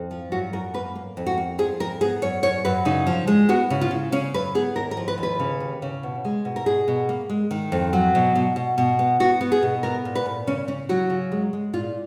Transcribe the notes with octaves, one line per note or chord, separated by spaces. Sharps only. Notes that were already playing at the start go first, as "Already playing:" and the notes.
Already playing: F2
F3
F#2 F#4
F#2 A#4
A#3 B4
A#3
F2
F#4
A#3
F3 G#4
F2 A#4
B3 G#4
F#2 C#5
F#2 C#5
F#2 B4
C#3 D#4
F3
G#3
B3 F#4
C#3
F4
C#3
C#3 C#4
F#2 B4
B3 G#4
D#2 A#4
A#4
F3
B4
D#2
B4
C#3
D#2
C#3
B2
G#3
B2
A#4
B2 G#4
B2
A#3
G#3
D#3
F2
F#3
B2
B2
B2
B2
B3
B3 F#4
B3
G#4
B2
B3 A#4
A#2
B4
A#2
C#3 C#4
C#3 C#4
F#3 F#4
C#3
G#3
G#3
A#2 F4